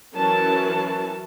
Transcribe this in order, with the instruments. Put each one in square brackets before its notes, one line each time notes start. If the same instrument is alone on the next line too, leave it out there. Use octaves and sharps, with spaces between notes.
[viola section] E3 F#3 C#4 A#4 A5